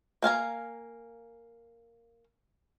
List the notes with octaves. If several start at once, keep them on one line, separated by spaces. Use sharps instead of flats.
A#3 F5 G#5 A#5